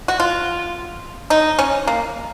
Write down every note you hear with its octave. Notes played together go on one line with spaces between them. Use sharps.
F#4
F4
D#4
C#4
A#3